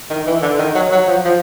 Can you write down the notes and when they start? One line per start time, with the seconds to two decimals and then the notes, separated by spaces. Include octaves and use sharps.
0.10 D#3
0.27 E3
0.42 D3
0.59 D#3
0.75 F#3
0.92 F#3
1.08 F3
1.25 F3